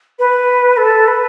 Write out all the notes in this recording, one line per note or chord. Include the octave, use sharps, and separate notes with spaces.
B4
A4
B4